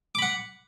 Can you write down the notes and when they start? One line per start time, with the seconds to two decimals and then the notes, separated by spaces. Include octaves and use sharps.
0.15 D6
0.19 B5
0.22 F#5